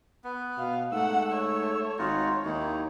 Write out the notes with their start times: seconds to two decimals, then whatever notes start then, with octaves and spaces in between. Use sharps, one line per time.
0.24 B3
0.57 B2 F5
0.92 G#2 A3 F#5 E6
1.32 C#5
1.98 G#1 D#4 F4 F#4 C#5
2.45 D#2 D#4 E4